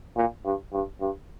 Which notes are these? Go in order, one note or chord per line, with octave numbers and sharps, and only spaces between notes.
A#2
G2
G2
G2